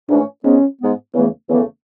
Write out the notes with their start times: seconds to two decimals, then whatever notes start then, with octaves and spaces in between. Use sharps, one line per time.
0.09 G#2 E3 A3 C#4 D4
0.44 G#2 G#3 B3 C#4
0.80 G#2 G#3 B3
1.14 E2 C#3 E3 A3 B3
1.49 E2 C#3 E3 A3 B3